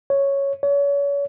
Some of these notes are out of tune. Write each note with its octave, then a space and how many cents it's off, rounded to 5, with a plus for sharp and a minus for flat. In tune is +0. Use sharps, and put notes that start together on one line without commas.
C#5 +0
C#5 +35